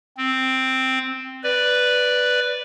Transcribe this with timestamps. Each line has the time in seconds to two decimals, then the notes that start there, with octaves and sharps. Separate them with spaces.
0.17 C4
1.44 B4 D5